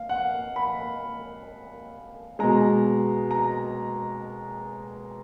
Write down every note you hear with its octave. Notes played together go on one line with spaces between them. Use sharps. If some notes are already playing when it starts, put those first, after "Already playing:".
Already playing: F5
F#5
B5
B2 G#3 A#5
A#5